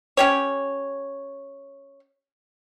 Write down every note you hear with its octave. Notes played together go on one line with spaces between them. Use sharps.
C#4 G4 C#5